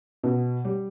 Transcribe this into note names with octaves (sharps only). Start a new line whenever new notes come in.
B2
G3